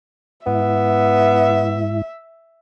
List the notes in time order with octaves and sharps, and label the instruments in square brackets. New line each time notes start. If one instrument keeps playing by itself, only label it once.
[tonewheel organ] G#2 E4 [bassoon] B3 [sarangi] E5